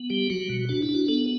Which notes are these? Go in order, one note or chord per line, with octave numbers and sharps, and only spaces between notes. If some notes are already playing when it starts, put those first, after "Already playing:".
Already playing: B3
G3 G4
F#3 F#4
B2
D4 F#4
E4
D4
F#4
B3 A4